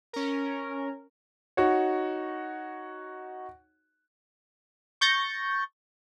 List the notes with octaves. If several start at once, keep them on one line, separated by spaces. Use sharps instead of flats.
C#4 A#4
D#4 F#4 C#5
C#6 G6 A6 A#6 C#7